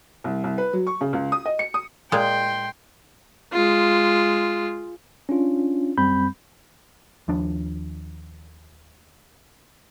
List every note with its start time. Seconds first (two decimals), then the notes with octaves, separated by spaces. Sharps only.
0.24 C2
0.44 C2
0.58 B4
0.73 F#3
0.87 C#6
1.01 C#3
1.13 C#2
1.32 D#6
1.46 D#5
1.59 C#7
1.74 D#6
2.12 A#2 G#3 G5 C6
3.52 G#3 F4
5.29 C#4 D4 F4
5.98 G#1 F#2 G3 C4 B5 G6
7.28 D#2 F3 D4